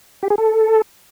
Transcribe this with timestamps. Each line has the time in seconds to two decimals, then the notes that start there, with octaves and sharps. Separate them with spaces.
0.23 G4
0.30 G#4
0.38 A4